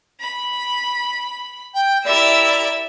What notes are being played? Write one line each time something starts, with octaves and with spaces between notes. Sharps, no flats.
B5
G5
E4 G4 A#4 D5 E5